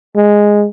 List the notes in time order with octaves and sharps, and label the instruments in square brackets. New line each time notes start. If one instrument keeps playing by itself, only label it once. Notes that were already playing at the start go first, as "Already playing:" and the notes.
[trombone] G#3